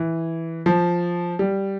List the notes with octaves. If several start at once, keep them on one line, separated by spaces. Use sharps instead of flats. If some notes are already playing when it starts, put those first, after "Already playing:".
Already playing: E3
F3
G3